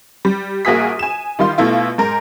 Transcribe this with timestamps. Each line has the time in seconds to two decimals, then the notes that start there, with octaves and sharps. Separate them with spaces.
0.25 G3
0.65 A#1 A#3 F#4 G#4 D#6 B6
0.99 G#5 E7
1.39 D#3 G3 F4 C6
1.58 B2 A3 E4 F4
1.98 G#2 A#4